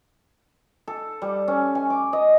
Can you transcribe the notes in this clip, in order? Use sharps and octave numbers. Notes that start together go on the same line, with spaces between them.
A4
G3
C#4
G#5
D6
D#5